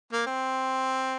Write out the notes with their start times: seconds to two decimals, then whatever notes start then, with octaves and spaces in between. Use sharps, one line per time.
0.12 A#3
0.26 C4